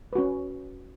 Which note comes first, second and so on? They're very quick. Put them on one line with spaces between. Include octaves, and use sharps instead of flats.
B4 F#4 C#4